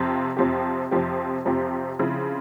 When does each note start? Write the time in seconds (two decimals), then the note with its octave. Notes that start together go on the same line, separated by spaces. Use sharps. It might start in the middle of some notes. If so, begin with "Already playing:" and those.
Already playing: F2 C3 F3 C4 G4
0.37 F2 C3 F3 C4 G4
0.91 F2 C3 F3 C4 G4
1.45 F2 C3 F3 C4 G4
1.99 C#3 F3 C4 E4